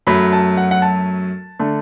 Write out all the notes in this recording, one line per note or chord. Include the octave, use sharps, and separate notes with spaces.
F#2 F#3 A3 B5
A5
F#5
F#5
A5
D3 A3